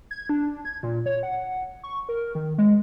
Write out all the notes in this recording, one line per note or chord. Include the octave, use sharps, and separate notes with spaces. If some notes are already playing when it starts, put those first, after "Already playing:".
G#6
D4
G#6
A#2
C#5
F#5
C#6
A#4
D#3
G#3